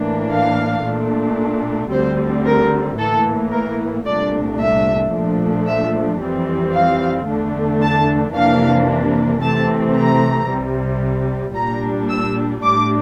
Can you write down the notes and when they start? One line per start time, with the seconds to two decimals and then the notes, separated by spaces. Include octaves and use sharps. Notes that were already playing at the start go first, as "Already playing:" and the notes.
Already playing: A2 E3 A#3 D4
0.31 F5
0.84 A#2 A3 D4
1.91 D2 D3 G3 C4 C5
2.45 A#4
2.98 A2 E3 A#3 A4
3.52 A#4
4.06 C2 A#2 A3 D4 D5
4.60 E5
5.12 A#2 F3 A3 D4
5.67 E5
6.20 F2 E3 G3 C4
6.73 F5
7.27 E2 D3 A3 D4
7.81 A5
8.34 F2 C3 E3 A#3 D4 F5
9.41 C3 E3 A3 C4 A5
9.96 A#5
10.48 C2 C3 G3
11.55 A#2 G3 D4 A#5
12.09 E6
12.63 A2 G3 D4 D6